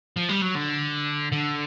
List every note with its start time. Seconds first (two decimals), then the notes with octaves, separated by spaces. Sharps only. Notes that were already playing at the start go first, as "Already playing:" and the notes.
0.17 F3
0.29 G3
0.42 F#3
0.55 D3
1.32 D3